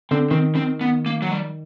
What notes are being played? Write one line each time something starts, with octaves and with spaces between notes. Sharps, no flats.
D3 C4
D#3 C4
C4
B3
A#3
F#3
G3